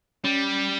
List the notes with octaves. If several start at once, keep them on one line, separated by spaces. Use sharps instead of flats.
G3 C#4